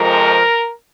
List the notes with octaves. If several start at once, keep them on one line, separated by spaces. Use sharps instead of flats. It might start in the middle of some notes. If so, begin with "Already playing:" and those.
Already playing: F2 C3 F3 G#3 A#4